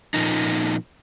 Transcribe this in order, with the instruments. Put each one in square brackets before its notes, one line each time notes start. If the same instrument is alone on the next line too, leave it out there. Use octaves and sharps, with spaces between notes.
[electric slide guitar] A#2 F3 A#3 C#4 D#4